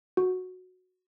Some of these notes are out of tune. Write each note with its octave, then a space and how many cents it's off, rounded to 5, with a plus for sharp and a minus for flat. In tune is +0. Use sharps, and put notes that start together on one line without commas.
F#4 -10